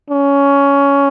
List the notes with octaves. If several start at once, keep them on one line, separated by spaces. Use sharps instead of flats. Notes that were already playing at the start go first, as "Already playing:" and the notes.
C#4